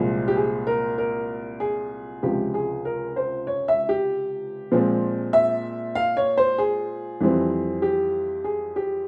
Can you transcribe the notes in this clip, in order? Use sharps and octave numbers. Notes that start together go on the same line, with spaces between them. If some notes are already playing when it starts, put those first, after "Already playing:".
Already playing: C2 A#2 F3 G#3 C4
G4
G#4
A#4
A#4
G#4
C#2 C3 F3 G#3 G4
G#4
A#4
C5
C#5
E5
G4
A#2 F3 G#3 C4
E5
F5
C#5
C5
G#4
F2 E3 G3 C4
G4
G#4
G4